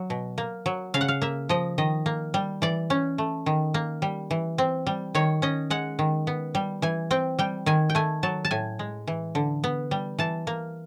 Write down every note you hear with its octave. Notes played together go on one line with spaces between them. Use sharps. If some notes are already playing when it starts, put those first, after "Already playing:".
Already playing: F#3
B2
A#3
F#3
C#3 F5
F#5
F5
A#3 E5
F3 D#5
D#3 D#5
A#3
G3
E3 D5
C#4
A3
D#3
A#3
G3
E3
C4
G3
D#3 C#5
C#4 D#5
G#3 F#5
D#3
B3
G3
E3 G#5
C4 G5
G3 G5
D#3 G#5
G5
A3 G#5
F#3 A5
A5
A2 G#5
G#3
E3
D3
B3
G3
E3 A5
A#3